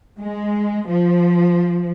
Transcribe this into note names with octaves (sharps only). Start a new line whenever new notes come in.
G#3
F3